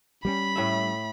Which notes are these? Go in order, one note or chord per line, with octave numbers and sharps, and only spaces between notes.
G3 B3 C#4 B5
A2 A3 E5